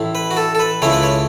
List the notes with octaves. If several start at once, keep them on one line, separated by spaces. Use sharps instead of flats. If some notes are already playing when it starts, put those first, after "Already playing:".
Already playing: A1 A2 A3 E4
B4
F#4
A4
A4
B4
C#2 C#3 A3 C#4 E4 C#5
B4
C#5